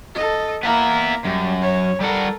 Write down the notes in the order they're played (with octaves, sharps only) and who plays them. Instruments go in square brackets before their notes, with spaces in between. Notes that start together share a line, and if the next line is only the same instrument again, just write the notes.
[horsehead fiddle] A4 D#5
[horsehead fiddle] A#3 A#5 [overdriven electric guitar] B3 E4
[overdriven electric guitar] F#2 [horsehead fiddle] G3
[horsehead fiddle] C#5
[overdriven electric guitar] G3 F#5 [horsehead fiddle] A4 A#4